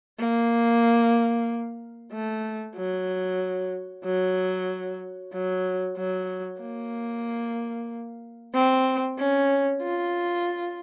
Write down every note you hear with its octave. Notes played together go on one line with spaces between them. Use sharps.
A#3
A3
F#3
F#3
F#3
F#3
A#3
C4
C#4
F4